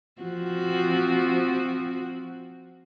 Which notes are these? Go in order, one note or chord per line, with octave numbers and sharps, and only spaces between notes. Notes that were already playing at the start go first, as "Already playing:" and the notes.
F3 C4 F#4